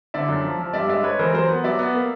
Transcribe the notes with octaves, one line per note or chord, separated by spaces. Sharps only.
D3 D5 E5
F#2
F3
F3
G2 D5 E5
G#3 D5 E5
G#3 B4 C#5
E3 A#4 C5
F#3 A#4 C5
B3
F#3 D5 E5
B3
A#3